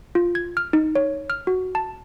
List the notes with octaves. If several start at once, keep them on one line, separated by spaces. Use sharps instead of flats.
F4
G#6
F6
D#4
C#5
F6
F#4
A5